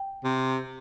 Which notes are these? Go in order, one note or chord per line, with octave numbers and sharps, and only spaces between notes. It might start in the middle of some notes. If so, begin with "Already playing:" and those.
Already playing: G5
C3